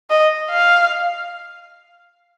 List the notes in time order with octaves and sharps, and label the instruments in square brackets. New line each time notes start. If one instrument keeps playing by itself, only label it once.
[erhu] D#5
F5